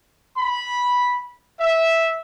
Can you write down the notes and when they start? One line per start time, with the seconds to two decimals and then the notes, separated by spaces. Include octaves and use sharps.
0.37 B5
1.60 E5